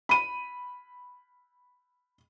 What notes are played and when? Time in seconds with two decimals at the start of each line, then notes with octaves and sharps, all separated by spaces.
0.09 B5 D#7